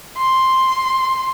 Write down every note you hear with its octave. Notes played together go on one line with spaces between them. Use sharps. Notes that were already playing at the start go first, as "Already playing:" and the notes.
C6